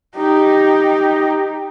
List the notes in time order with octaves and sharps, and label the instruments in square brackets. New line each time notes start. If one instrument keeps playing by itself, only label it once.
[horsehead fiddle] D#4 G4